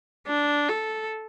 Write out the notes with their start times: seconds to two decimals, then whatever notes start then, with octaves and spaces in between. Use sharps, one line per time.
0.27 D4
0.69 A4